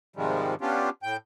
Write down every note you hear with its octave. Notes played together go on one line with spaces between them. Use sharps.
G#2 C3 D#3 F3 G3 G#3
B3 C#4 D4 F4 G4
A2 G5 G6